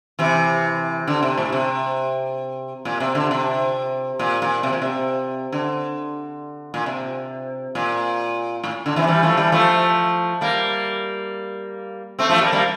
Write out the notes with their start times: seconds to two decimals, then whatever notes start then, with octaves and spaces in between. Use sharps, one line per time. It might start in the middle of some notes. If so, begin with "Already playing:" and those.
0.19 C3 E3
1.08 D3
1.23 C3
1.38 A2
1.52 C3
2.85 A#2
3.00 C3
3.15 D3
3.31 C3
4.19 A#2
4.42 A#2
4.63 C3
4.73 A#2
4.82 C3
5.53 D3
6.74 A#2
6.86 C3
7.75 A#2
8.64 A2
8.86 D3
8.96 C3 E3
9.07 E3 G3
9.23 F3 A3
9.37 E3 G3
9.52 F3 A3
10.41 G3 A#3
12.19 A3 C4
12.29 F3 A3
12.41 G3 A#3
12.52 G3 A#3